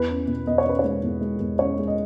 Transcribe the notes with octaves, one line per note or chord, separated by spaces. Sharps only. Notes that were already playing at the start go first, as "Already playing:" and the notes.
Already playing: E2 B4
C#4
B2
E2 D#5
C#5
C#4 B4
C#5
G#3
E2
G#3
E2
C#4 C#5
G#3
D#5